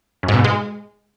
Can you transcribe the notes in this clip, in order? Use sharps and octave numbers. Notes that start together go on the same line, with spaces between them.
F#2
G#2
B2
G#2
G#3